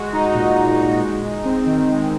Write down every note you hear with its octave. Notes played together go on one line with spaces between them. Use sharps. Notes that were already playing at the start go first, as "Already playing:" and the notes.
Already playing: G#3 F#4
D#4
A#2
G#3
F#4
G#3
D#4
C4
D#3
G#3